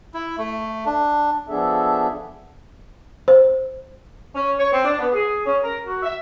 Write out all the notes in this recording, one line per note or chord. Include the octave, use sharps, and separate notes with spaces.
E4
A3
D4
F3 B3 D4 G#4 A4 E5
C5
C#4
C#5
C4
D4
B3
G#4
C#4
A#4
F#4
E5